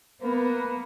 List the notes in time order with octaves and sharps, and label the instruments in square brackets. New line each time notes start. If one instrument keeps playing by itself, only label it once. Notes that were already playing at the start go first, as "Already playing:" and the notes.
[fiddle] A#3 [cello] B3 [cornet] B4